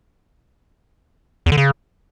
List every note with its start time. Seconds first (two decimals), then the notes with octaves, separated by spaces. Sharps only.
1.46 E2
1.52 D3
1.57 C#3